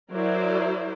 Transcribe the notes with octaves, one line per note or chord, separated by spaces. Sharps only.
F#3 E4 A#4 C5 D5